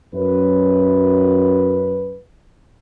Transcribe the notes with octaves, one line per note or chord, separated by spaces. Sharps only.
F#2 B4